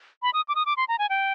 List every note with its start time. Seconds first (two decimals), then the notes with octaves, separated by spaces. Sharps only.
0.23 B5
0.34 D#6
0.49 D6
0.55 D#6
0.66 D6
0.77 C6
0.88 A#5
0.99 G#5
1.10 G5